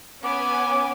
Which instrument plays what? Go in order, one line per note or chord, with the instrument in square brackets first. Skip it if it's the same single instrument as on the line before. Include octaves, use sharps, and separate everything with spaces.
[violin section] B3 C#4 G#5 [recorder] D6